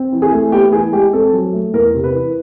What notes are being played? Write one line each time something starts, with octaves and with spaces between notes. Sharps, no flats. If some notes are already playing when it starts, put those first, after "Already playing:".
Already playing: C4
E3
G#4
A3
B3 G4
E3 G#4
G#3 G4
C4 A4
F#3
A3
E2 A#4
C3
B4
E3